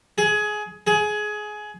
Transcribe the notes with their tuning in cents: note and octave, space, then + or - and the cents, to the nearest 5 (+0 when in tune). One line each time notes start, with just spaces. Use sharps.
G#4 +20
G#4 +20